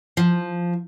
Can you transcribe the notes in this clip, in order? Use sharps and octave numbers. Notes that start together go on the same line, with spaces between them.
F3